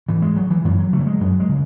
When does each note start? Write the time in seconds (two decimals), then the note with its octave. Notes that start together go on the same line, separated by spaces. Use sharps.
0.08 G#2 E3
0.22 G#3
0.37 F#3
0.50 E3
0.64 F#2 E3
0.79 F#3
0.92 C#3 A3
1.00 F#3
1.07 G#3
1.20 F#2 F#3
1.40 G#3
1.49 C#3